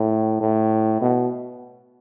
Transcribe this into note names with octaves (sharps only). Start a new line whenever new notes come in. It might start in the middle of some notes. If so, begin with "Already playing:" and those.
Already playing: A2
A2
B2